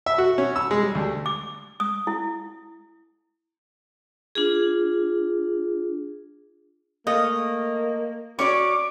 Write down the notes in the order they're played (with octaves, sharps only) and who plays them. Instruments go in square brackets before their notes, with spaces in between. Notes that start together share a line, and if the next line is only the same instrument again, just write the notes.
[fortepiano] E5
F#4
C#4
E6
G#3
G3
D2
[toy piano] D6
D#6
E4
[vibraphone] D4 F4 G#4
[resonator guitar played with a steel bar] A3 F5 [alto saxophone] A#3 [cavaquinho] D#5
[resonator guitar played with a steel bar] C#4 C#5 D5 [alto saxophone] F#4 [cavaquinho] C#6 [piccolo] D6